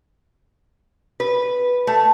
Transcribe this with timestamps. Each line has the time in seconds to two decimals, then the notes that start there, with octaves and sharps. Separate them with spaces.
1.20 B4
1.87 A3